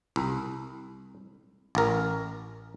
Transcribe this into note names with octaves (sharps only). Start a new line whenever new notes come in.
C2
A1 A#4